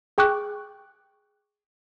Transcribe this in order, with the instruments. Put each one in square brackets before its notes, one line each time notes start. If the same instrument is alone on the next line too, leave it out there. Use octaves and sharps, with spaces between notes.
[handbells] G#4 G5 C#6 D6 F#6